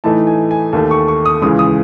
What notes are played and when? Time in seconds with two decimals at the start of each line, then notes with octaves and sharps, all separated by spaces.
0.04 A2 E3 A3 D#4 A5
0.27 G#5
0.51 G#5
0.73 D#2 D#3 A3 A5
0.91 C#6
1.08 C#6
1.26 D#6
1.42 C#2 C#3 E3 D#6
1.59 D#6